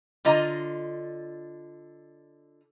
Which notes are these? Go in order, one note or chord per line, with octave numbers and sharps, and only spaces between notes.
D3 F4 D#5 A#5